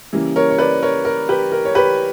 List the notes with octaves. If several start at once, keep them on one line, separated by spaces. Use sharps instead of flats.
C#3 E3 G3 A#3
A#4 C#5
C#5
B4 D5
A#4 C#5
A#4
G4 B4
A#4
C#5
G4 B4